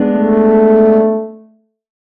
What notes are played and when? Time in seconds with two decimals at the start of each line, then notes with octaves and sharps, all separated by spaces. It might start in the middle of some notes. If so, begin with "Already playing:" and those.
Already playing: G#3 B3 D4
0.12 A3